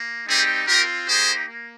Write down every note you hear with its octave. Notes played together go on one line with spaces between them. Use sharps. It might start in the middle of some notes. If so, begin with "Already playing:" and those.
Already playing: A#3
G3 C4 D#4 G4 G#4
C4 F4 G4 A#4
A#3 D#4 G4 G#4 C5
A#3